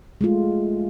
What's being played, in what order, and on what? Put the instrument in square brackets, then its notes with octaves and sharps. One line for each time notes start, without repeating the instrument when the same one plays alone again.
[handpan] G#3 A3 F4